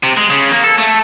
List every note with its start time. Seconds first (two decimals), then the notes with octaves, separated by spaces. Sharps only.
0.03 C3
0.17 G#3
0.30 C#3
0.51 A#3
0.64 A4
0.78 A3